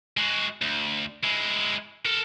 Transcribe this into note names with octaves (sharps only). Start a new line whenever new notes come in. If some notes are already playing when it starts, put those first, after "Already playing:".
G#3 F#4
D2
G#3 E4
A4 A#4